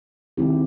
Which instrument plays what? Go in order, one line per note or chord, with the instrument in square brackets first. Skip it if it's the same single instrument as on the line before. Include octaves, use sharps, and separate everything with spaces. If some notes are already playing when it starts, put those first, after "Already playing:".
[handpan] D#3 G#3 C4 E4 G4